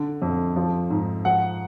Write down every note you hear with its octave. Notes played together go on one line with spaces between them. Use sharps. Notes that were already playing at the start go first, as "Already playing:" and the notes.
Already playing: D3
F2
F3
G#2
F3 F#5